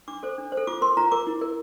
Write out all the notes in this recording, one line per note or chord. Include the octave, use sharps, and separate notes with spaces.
D4 D6
A4 C5
D4
C5
A4
F4 D6
A#4 C6
F4 A#5
A#4 D6
E4
A#4